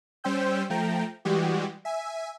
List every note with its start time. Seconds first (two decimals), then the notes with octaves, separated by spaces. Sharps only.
0.24 G3 C#4 C5 G5 E6 G6
0.70 F3 A3 G5 A#5
1.25 E3 G3 G#3 F#4 G4
1.85 E5 G#5